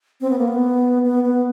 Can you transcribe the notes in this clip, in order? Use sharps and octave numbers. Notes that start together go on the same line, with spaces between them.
C4
B3
A#3
B3
B3
B3